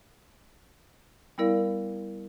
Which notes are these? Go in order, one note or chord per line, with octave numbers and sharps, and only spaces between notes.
G3 B3 E4 A#4 D5 F5